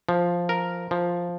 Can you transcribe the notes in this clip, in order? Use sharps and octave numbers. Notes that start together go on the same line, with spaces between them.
F3
A#4
F3